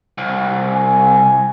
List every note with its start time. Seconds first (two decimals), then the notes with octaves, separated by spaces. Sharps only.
0.18 C2
0.69 G#5